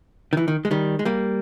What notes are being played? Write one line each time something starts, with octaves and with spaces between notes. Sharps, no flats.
D#3
E3
D#3
G#3
D#3 G3
G#3
G3 A#3